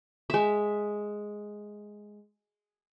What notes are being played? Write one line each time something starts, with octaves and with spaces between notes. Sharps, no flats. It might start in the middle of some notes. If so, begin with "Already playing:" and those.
G#3 E5